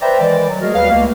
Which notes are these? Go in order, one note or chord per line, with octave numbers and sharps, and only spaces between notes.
B4 C5 D5 E5 G5 A#5
D#3 E3 G#3 D5
F#3
G#3 A3 F#4 G#4 A#4
D#2 G3 B4 F5
C#2 A3 A#3